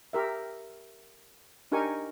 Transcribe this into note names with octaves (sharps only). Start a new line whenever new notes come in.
G4 A#4 E5
D4 D#4 G4 A#4 G#5 C#6